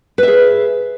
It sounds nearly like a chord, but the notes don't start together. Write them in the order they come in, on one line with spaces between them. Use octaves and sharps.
B4 E5 G#4